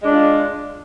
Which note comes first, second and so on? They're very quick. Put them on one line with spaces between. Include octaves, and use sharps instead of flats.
G#3 D4 F4